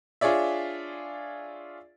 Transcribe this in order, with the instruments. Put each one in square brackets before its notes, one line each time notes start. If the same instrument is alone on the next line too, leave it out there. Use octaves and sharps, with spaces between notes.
[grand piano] D4 F4 G#4 C#5 D5 E5